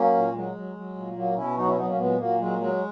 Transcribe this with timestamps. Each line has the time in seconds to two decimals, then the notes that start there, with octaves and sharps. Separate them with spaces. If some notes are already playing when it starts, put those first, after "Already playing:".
Already playing: F#3 A#3 C#4
0.14 A#2
0.34 F#3 G#3
0.55 F#3
0.75 F#3
0.96 A#2
1.16 F#3 A#3
1.36 B2 C#4 E4
1.57 F#3 D#4 F#4
1.67 C#4 E4
1.77 F#3 B3 D#4
1.88 A#3 C#4
1.98 A#2 G#3 B3
2.18 A#2 F#3 A#3
2.39 F#3 G#3
2.59 F#3 G#3